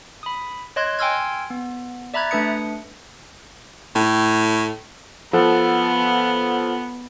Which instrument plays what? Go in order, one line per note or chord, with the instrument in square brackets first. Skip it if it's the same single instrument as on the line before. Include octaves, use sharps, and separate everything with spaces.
[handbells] B5 D#6
C#5 D#5 C6 F#6 G#6
G5 G#5 C6 E6 F6 G#6
B3
D5 E5 A#5 B5 F#6 G#6
A3 D4 B4 D#6 C#7
[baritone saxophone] A2
[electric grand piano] F3 A4 F#5 [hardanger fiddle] B3